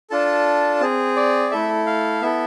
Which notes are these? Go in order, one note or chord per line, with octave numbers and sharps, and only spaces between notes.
D4 F4 A4 A5
C4 G#4
D5
A3 E4 A4 E5
F5
B3 E4 A4 E5